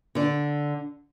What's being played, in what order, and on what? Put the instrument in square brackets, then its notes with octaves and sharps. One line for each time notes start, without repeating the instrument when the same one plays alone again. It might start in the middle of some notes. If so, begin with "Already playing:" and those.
[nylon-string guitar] D3 D5